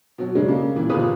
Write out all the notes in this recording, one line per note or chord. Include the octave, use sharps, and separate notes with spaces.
B2 F#3
C#3 F#3 G#3 A3 C#4 D4
C#3 A#3
A#2 E3 G3
G1 A#2 F4 G#4 B4 D#6